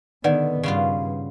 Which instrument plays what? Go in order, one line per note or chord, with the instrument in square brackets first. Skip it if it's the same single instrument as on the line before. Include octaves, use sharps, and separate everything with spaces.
[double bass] D3 B3 [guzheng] D#3 [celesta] B4 D5 F#5
[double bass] G2 [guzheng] C#3 B3 F4